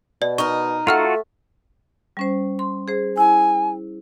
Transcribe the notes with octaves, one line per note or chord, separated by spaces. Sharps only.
B2 D5
D#4 A#4 C#6
A3 F4 F#4 A4 F#5 F6 F7
G3 C#4 C5
C6
G#4 C5
E4 G#5